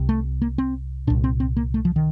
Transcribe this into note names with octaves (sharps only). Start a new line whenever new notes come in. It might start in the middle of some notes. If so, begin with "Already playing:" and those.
Already playing: C2 C3
A3
A#3
C4
C2 A#2 D4
C4
C4
A#3
A3
F3
D#3